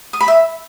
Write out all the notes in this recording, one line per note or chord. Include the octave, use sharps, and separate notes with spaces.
D#6
B5
E5